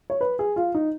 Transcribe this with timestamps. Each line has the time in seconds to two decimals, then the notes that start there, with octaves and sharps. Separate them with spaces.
0.10 C#5
0.21 B4
0.39 G#4
0.56 F4
0.75 D#4